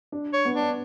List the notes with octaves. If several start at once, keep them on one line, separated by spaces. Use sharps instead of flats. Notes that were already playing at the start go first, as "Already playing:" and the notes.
D4
C#5
B3
D4